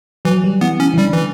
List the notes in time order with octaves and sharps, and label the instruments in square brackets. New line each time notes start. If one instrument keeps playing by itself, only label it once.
[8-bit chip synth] E3 [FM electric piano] F#3
[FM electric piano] G3
[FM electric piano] E3 [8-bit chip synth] B3
[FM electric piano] E3 [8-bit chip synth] C#4
[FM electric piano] E3
[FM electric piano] D3 [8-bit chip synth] G3
[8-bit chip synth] E3